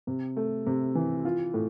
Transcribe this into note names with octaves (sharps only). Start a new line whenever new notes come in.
C3
A3
C3
E3
F4
A2